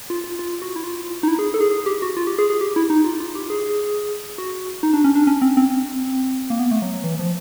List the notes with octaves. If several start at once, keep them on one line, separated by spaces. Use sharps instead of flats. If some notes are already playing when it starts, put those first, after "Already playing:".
F4
F4
F4
F#4
E4
F4
D#4
E4
G#4
A4
G#4
G#4
G4
F#4
F4
G4
G#4
G#4
G4
E4
D#4
F4
F4
G4
G#4
F#4
D#4
D4
C#4
D4
C#4
C4
C4
A#3
B3
A3
F#3
F#3
E3
F3